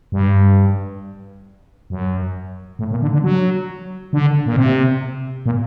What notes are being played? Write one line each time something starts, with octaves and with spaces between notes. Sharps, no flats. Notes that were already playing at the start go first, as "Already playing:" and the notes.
G2
F#2
A2
A#2
D3
D3
F#3
D3
A#2
C3
A#2